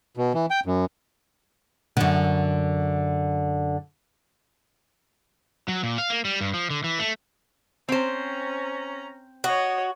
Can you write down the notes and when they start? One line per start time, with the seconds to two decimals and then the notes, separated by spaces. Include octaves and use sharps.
0.17 B2
0.34 E3
0.51 G5
0.66 F#2
1.97 F#2 D3
5.68 F#3
5.83 A#2
5.98 F5
6.10 A#3
6.25 G3
6.41 G2
6.54 F3
6.70 D3
6.84 E3
6.99 A3
7.89 C4 C#4 C5 A#5
9.44 F#4 C#5 D#5